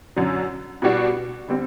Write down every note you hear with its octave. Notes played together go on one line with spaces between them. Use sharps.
F#2 D3 F#3
B2 G3 D4 F#4
D3 G3 C4